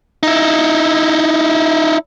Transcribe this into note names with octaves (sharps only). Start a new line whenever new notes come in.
D#4 E4